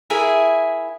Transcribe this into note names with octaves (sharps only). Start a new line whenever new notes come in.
E4 G#4 A#4 E5